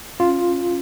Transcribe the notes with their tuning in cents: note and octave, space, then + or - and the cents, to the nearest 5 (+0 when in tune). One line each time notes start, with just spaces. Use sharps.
C#4 -10 F4 +0